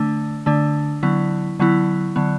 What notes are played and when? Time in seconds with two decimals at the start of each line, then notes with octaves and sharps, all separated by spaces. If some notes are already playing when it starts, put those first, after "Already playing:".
Already playing: D3 A3 D4
0.46 D3 A3 D4
1.03 D3 F#3 B3 E4
1.59 D3 F#3 B3 E4
2.16 D3 F#3 B3